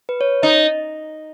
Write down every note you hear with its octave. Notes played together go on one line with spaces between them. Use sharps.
B4
C#5
D#4 D#5